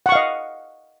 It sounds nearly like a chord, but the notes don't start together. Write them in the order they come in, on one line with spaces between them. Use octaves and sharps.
F#5 C#6 F5 D#5